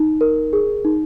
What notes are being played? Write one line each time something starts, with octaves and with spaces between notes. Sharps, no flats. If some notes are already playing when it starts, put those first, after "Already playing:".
Already playing: D#4
A#4
G#4
D#4